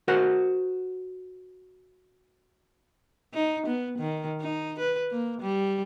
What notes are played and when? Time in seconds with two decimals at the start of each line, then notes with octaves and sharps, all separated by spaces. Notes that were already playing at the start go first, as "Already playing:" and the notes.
0.08 F#4 A#4 C5 F#5
3.34 D#4
3.66 B3
3.98 D#3
4.41 D#4
4.79 B4
5.11 A#3
5.41 G3